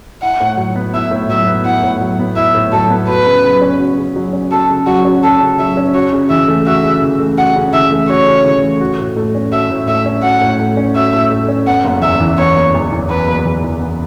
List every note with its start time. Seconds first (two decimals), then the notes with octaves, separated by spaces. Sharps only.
0.22 E4 F#5
0.40 A2
0.57 F#3
0.76 B3
0.94 E4 E5
1.11 A2
1.29 F#3 E5
1.47 B3
1.65 E4 F#5
1.84 A2
2.01 F#3
2.19 B3
2.36 E4 E5
2.54 A2
2.72 F#3 A4
2.90 B3
3.08 F#4 B4
3.26 C#3
3.44 F#3
3.62 C#4
3.80 F#4
3.98 C#3
4.16 F#3
4.33 C#4
4.51 F#4 A4
4.69 C#3
4.87 F#3 F#4
5.05 C#4
5.23 F#4 A4
5.41 C#3
5.59 F#3 E5
5.77 C#4
5.94 F#4 C#5
6.13 C#3
6.30 E3 E5
6.48 A3
6.66 F#4 E5
6.84 C#3
7.02 E3
7.20 A3
7.37 F#4 F#5
7.56 C#3
7.73 E3 E5
7.91 A3
8.09 F#4 C#5
8.27 C#3
8.44 E3
8.63 A3
8.81 F#4
8.99 A2
9.16 A3
9.35 C#4
9.52 F#4 E5
9.70 A2
9.88 A3 E5
10.06 C#4
10.23 F#4 F#5
10.41 A2
10.59 A3
10.77 C#4
10.95 F#4 E5
11.13 A2
11.30 A3
11.49 C#4
11.67 B3 F#5
11.85 F#1
12.02 E2 E5
12.20 E3
12.38 B3 C#5
12.56 F#1
12.75 E2
12.92 E3
13.09 B3 B4
13.28 F#1
13.45 E2
13.63 E3
13.81 B3